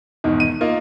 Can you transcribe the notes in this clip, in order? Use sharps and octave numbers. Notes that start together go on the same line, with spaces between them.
E2 G#2 B2 D#3
D#7
A#3 D#4 F4